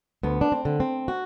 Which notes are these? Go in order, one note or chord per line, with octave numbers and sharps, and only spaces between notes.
D2 B3
D4
C4
D3
C4
F#4